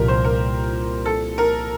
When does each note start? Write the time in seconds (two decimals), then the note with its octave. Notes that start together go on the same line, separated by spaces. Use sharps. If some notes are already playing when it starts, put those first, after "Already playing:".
Already playing: C2 A#2 F3 G4 A#4
0.08 C5
0.24 A#4
1.05 A4
1.38 A#4